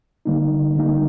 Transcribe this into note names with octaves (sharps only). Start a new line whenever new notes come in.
D3 G3 A#3 D#4
D3 G3 A#3 D#4